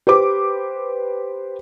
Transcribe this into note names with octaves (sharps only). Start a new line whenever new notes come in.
G4 B4 C5 D6